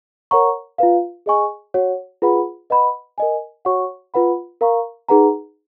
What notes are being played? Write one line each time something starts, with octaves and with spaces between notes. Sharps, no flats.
A#4 C#5 F#5 A#5 C#6
F4 B4 F5
G#4 D#5 G#5 C#6
F#4 C#5 F#5
F4 G#4 B4 F#5 B5
B4 D#5 F#5 B5
A#4 D#5 G#5
F#4 C#5 F#5 C#6
F4 B4 F#5 B5
A#4 F5 A#5 C#6
D#4 G#4 B4 F#5 A#5